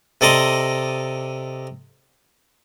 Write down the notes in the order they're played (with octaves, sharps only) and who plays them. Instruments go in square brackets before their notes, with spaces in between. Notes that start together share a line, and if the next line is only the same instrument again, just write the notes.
[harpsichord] C3 A4 D5 D#5 A#5 C6